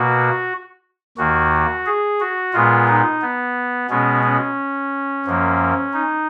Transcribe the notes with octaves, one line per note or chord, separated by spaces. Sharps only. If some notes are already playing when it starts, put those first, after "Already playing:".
Already playing: B2 A#3 F#4
D#2 D#3 A#3 F#4
G#4
F#4
A#2 G#3 B3 F4
D#4
B3
B2 G#3 B3 C#4
C#4
F#2 F3 A#3
D#4